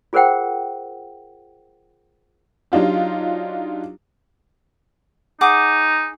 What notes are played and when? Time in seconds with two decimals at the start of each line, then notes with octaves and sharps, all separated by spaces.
0.13 F4 G#4 A#4 C5 F#5 G5
2.72 F#3 D4 D#4 F4 G4
5.41 D#4 G#4 F#5 D6